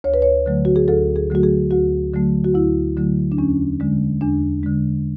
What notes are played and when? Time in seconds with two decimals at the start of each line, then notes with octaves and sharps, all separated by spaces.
0.04 D2 C#5
0.14 B4
0.22 C#5
0.46 D3 F#3 A3
0.65 F#4
0.76 G#4
0.88 D2 A4
1.16 G#4
1.30 D3 F#3 A3 F#4
1.43 G#4
1.71 D2 F#4
2.13 D3 F#3 A3
2.44 F#4
2.55 D2 E4
2.97 D3 F#3 A3
3.32 D4
3.38 E2 C#4
3.80 D3 G#3
4.21 E2 D4
4.63 D3 G#3